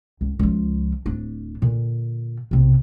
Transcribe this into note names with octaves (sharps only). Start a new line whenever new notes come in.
C#2
C#2 F3
D1 D4
A#2 D3
B1 C3